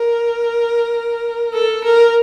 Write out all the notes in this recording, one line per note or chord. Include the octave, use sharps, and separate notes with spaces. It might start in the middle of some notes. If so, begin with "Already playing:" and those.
Already playing: A#4
A4
A#4